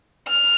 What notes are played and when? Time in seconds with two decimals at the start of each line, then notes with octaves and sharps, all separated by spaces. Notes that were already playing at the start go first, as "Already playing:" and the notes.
0.28 F6